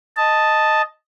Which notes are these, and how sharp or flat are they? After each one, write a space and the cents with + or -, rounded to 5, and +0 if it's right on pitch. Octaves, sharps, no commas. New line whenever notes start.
D#5 +0 A5 +0